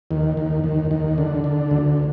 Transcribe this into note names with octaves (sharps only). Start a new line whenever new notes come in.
D#2
D#2
D#2
D#2
D3
D3
D2